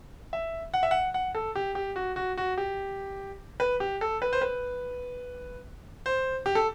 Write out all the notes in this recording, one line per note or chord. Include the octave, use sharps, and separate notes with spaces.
E5
F#5
E5
F#5
F#5
A4
G4
G4
F#4
F#4
F#4
G4
B4
G4
A4
B4
C5
B4
C5
G4
A4